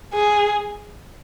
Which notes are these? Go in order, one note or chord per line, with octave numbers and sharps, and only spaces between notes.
G#4